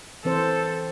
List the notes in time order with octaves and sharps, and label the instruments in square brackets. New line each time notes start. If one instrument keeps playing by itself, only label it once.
[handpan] E3 C4 C5 [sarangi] A4